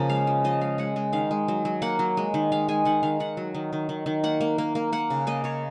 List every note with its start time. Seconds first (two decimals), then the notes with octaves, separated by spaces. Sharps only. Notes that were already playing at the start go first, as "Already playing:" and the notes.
Already playing: C#3 F3 A#3
0.09 G#3 F5
0.27 F3
0.44 F3 D#5
0.61 G#3 F5
0.78 G#3 F#5
0.96 G#3
1.13 D#3 F5
1.31 G#3
1.48 F#3
1.65 F#3
1.82 A#3 F#5
1.99 F#3
2.17 G#3
2.34 D#3
2.52 G#3 F5
2.69 G#3 G#5
2.85 D#3 F#5
3.03 D#3 F5
3.20 D#3 F#5
3.37 F#3
3.55 D#3
3.73 D#3
3.89 D#3
4.06 D#3
4.24 A#3 F#5
4.41 A#3
4.58 A#3
4.75 A#3
4.92 A#3 F#5
5.10 C#3
5.27 A#3 D#5
5.44 C#3 C#5